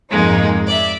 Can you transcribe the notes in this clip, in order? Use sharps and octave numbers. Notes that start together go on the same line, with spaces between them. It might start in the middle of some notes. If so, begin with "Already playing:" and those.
F2 G#2 G#3 A#3 D#4
D5 E5